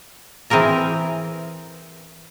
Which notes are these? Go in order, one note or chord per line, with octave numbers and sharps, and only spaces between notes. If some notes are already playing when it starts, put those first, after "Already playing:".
E3 C4 G#4 A#4 A#5